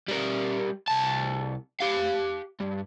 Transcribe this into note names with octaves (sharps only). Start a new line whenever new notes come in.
G3 A#4
C2 A5
G4 F5
G2